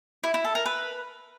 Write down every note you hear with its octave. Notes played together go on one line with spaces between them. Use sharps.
E4
E4
A4
A#4
B4